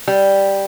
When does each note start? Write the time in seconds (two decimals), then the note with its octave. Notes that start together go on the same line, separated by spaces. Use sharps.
0.08 G3